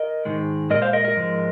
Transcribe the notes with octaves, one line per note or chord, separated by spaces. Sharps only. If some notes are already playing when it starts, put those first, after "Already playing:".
Already playing: A#4 D#5
G#2 D#3 G#3
A#2 F3 G#3 A#4 D#5
C5 F5
A#4 D#5
A#4 D#5
G#2 F3 G#3